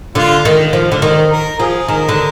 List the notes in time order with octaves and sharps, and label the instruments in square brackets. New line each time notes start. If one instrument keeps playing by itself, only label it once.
[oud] D3 [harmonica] F4
[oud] D#3
F3
D3
D#3
[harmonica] A#4
[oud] F3 [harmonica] G#4
[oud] D#3 [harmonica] A#4
[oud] D3